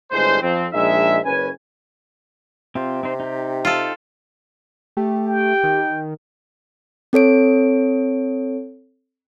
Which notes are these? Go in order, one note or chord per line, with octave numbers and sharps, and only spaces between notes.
G1 A2 G#3 C5
F2 C4
A#1 G#3 D#4 E5
F#1 C#4 B4 G#5
C3 C4 F4 C5
C4 D#4 C5
D#4 G4
F4 A4
A3 G4
G5
D#3
C4 A4 C#5 D7